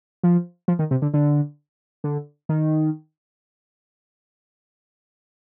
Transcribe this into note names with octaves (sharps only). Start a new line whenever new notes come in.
F3
F3
D#3
C3
D3
D3
D3
D#3